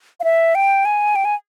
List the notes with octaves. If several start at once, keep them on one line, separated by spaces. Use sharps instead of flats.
F5
E5
G5
G#5
G5
G#5